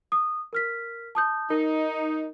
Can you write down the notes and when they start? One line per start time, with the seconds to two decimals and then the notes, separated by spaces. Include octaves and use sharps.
0.12 D#6
0.53 A#4 F6 B6
1.15 A5 D#6 G6
1.50 D#4 A#4